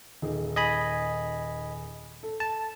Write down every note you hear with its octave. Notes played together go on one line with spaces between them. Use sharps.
D#1 D#4 G#4
D#5 G#5 B5
A4
A5